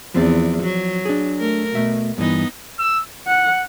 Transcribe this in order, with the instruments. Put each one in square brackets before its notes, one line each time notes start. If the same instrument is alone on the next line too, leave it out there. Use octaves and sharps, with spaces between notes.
[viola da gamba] E2 [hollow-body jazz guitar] F3 C4 D5
[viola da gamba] F#3
[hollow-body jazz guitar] D4 G#4
[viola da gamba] A3 A#4
[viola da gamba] B2 [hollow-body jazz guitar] A3 E5
[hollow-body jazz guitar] G2 E3 [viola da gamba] B3 D#4
[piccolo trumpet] E6
[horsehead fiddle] F#5